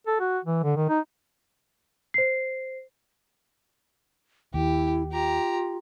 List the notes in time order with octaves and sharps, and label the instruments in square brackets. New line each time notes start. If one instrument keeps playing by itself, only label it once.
[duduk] A4
F#4
E3
D3
D#3
D#4
[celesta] C5 C7
[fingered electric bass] D#2 [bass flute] E4 [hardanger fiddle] G4
[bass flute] F4 [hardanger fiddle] G4 A#5